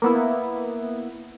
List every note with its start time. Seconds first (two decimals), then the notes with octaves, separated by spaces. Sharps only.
0.02 A#3 B3 E4